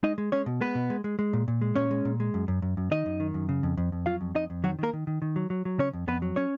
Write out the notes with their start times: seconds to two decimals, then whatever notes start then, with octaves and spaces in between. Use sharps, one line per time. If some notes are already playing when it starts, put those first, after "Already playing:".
0.03 G#3 D#4 D#5
0.18 G#3
0.32 G#3 C#4 C#5
0.46 B2
0.61 G#3 B3 B4
0.75 B2
0.90 G#3
1.04 G#3
1.19 G#3
1.33 A#2
1.48 A#2
1.61 G#3
1.76 A#2 C#4 C#5
1.91 G#3
2.05 A#2
2.20 G#3
2.34 F#2
2.48 F#2
2.62 F#2
2.77 F#2
2.91 D#3 D#4 D#5
3.06 F#2
3.20 D#3
3.34 F#2
3.49 C#3
3.63 F2
3.77 F2
3.92 F2
4.06 F#3 F4 F5
4.21 F2
4.35 F2 D#4 D#5
4.50 F2
4.64 D#3 F#3 F#4
4.79 D#3 A#3 A#4
4.93 D#3
5.07 D#3
5.22 D#3
5.36 F#3
5.50 F#3
5.65 F#3
5.78 C#3 C#4 C#5
5.93 F2
6.07 F2 B3 B4
6.22 F#3
6.36 C#4 C#5